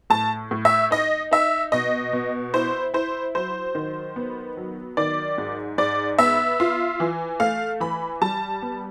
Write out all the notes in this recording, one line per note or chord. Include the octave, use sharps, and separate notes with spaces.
A2 A5
A2
E5
D#4 D#5
D#4 E5
B2 D#5
B2
E4 C5
E4 C5
F#3 C5
D#3
B3
F#3
D#3 D5
G#2
G#2 D5
B3 E5
F4
E3
A3 F5
E3 B5
G3 A5
B3